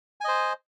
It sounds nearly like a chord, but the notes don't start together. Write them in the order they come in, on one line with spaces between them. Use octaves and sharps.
G#5 D#5 C5